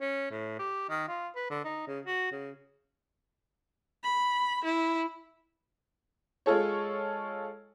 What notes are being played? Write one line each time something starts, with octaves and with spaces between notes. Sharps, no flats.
C#4
A2
G4
D#3
F4
B4
D3
D#4
C#3
F#4
C#3
B5
E4
G#3 F4 A4 C#5